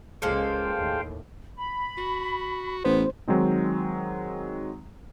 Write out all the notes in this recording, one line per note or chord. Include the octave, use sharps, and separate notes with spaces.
C#2 G#3 A#3 A4 C5 F5 G5
D#2 A2
B5
F#4
A1 B3 C5
D#3 F#3 G#3 C4 D#4